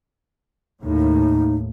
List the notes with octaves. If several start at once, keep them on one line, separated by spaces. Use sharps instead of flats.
D#2 A2 D#4